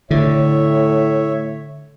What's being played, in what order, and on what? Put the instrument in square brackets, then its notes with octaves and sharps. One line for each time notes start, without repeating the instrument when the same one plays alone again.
[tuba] A2 [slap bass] D3 [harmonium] C#5 E5